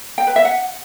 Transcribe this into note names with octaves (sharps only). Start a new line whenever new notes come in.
G5
B4
E5
F#5